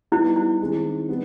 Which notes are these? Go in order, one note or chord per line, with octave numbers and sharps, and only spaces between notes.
G3 B3 D#4 E4
E4
D#3 G#3 C4
G3 B3